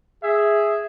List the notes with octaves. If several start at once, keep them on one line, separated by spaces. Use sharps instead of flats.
G#4 E5